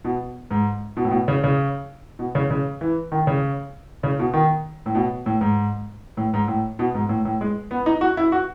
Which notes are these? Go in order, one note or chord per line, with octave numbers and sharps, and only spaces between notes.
B2
G#2
B2
A2
B2
C#3
C#3
B2
C#3
C#3
E3
D#3
C#3
C#3
B2
D#3
A2
B2
A2
G#2
A2
G#2
A2
B2
G#2
A2
A2
G#3
B3
D#4
F#4
E4
F#4